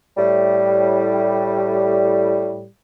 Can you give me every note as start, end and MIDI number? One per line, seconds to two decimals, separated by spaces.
0.18 2.66 45
0.18 2.66 55